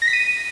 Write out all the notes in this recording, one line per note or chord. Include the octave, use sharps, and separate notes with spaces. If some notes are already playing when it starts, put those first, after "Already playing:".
A#6
B6
D#7